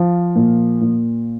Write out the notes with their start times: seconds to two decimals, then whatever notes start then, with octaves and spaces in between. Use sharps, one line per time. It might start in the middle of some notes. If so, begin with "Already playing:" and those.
Already playing: F3
0.35 A#2
0.81 A#2